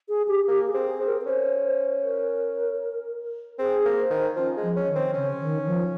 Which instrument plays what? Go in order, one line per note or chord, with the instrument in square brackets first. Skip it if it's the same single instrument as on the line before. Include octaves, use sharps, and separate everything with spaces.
[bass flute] G#4
G4
[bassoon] A#3 [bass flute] G4
[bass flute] G#4
[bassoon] C4
[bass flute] G#4
[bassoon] C4
[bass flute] A#4
A#4
[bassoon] C#4 [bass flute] C5
[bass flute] C5
A#4
[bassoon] C4 [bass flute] G#4
[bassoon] A#3
[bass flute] C5
[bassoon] D#3
[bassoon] F3 [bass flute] C#4
[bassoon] G#3
[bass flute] F3
[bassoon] C#4
[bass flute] D#3
[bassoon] C4
[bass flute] C#3 [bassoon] C#4
[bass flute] D#3
F3